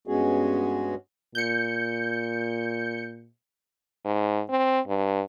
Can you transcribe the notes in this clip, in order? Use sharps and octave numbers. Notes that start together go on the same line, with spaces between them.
G2 G#3 B3 C#4 F#4 G#4
A#2 G6 C#7
G#2
C4
G2